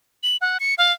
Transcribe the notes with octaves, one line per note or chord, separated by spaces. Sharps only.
F#7
F#5
C#7
F5